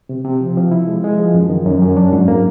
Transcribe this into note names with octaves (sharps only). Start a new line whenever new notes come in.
C3
C3
F3
F3
E4
G#3
G#3
F3
F#2
D#3
F#2
F#2
D4
G#2
A#3